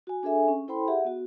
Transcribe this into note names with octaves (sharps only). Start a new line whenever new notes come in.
F#4 G#5
D4 G#4 A4 E5 G#5
C#4
E4 A4 C5 G5 B5 C6
G4 G#4 E5 F#5
B3 F#4